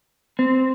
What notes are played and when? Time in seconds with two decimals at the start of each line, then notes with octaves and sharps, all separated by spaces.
0.39 C4